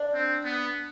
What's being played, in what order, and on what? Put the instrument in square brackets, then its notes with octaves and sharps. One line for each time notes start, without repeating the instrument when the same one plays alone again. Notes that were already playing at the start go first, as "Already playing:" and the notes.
Already playing: [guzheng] D4
[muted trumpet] C4
B3